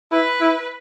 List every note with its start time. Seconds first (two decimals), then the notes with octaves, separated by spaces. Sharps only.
0.12 E4 B4
0.41 E4